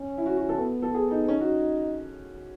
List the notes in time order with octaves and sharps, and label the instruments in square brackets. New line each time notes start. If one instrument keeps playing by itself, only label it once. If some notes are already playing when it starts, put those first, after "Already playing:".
Already playing: [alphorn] C#4
[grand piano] E4
F#4
F#4
A4
[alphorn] B3
[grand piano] A4
G#4
D#4
[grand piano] C#4 [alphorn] D#4
[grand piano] F#4